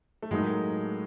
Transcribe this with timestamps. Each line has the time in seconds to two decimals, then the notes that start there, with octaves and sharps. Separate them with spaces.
0.22 A3
0.31 A2 F#3 G#3 A#3 D#4